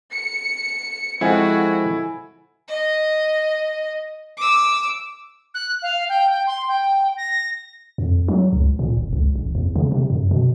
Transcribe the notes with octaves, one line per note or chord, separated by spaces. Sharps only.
C#7
F3 G#3 C4 E4 F#4 A4 G#5
D#5
D6 E6
F#6
F5
G5
G5
C6
G5
A#6
F2
F#3
C#2
A#2
G1
C#2
A1
E2
C#3
C3
F#2
B2